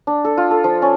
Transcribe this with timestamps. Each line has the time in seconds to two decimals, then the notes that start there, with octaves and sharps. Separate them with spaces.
0.07 D4
0.25 A4
0.37 F4
0.51 A4
0.64 F3
0.82 C#4